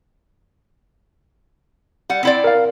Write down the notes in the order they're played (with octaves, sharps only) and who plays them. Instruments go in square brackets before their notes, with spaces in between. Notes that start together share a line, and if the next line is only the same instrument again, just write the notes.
[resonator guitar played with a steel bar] G3 F#5
C4 E4 D5
[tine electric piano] A#4 F5